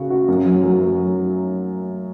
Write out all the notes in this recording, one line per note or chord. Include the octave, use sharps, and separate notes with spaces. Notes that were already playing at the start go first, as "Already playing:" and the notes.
Already playing: C#3 F#4
F#4
F#2
F#3
F#3
F#3